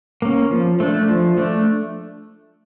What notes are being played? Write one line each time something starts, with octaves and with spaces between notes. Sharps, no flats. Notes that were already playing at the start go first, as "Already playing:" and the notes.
A#3 C#4
F3
A3 D4
F3
A3 D4